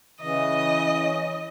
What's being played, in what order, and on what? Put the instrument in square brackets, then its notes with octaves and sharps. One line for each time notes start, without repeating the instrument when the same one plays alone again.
[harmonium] C#3 E3 [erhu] D#5